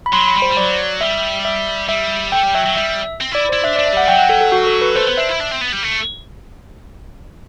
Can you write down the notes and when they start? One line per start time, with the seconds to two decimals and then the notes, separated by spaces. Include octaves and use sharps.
0.06 B5
0.12 F#3 C6
0.28 B5
0.35 G3
0.42 C5
0.51 G3
0.57 F#3 D5
1.01 G3 E5
1.45 E5
1.89 G3 E5
2.32 A3 G5
2.43 G3
2.55 F#3 E5
2.66 F#3
2.76 G3 E5
3.21 C4
3.32 E4 D5
3.49 C5
3.53 E4
3.64 D4 E5
3.76 D5
3.79 D4
3.86 E5
3.93 G3 F#5
4.08 F#3 G5
4.19 F#5
4.29 A4
4.41 A4
4.52 F#4
4.67 A4
4.81 B4
4.95 A3 C5
5.07 B3
5.17 D4 E5
5.29 E4
5.40 D4
5.51 C4
5.61 B3
5.72 G3
5.83 A3